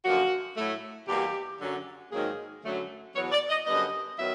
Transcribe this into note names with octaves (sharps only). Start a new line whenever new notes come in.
F#2 D3 F3 A#3 F#4
A2 F#3 A3
E2 B2 G3 A#3 G4
F#2 D3 F#3
G#2 D#3 F#3 A#3 G#4
F#2 D3 F#3 A3
E2 B2 F#3 B3 C#5
D5
D#5
F#2 D3 G3 B3 D#5
D#3 F#3 B3 E5